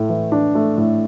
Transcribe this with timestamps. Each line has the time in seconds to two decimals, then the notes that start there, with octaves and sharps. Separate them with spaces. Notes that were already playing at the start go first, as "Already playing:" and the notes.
Already playing: A2 A3
0.09 E3
0.32 D4
0.55 A3
0.77 A2